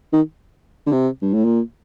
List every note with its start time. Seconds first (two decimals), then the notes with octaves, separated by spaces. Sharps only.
0.13 D#3
0.86 D3
0.92 C3
1.22 G2
1.33 A2
1.44 A#2